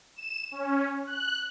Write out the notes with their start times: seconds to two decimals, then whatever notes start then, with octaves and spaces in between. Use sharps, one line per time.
0.16 E7
0.51 C#4
1.06 F#6